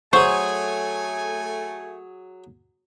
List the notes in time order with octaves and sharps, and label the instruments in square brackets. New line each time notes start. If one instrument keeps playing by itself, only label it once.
[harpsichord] F#3 G#4 [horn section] A3 G#5 [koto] C5 [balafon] C#6